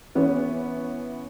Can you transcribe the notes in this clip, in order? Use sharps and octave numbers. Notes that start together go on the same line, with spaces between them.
E3 B3 C#4